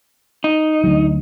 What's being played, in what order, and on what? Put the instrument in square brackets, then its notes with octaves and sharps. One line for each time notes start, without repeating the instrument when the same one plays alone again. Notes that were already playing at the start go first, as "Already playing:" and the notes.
[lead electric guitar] D#4
[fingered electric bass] D2 F#3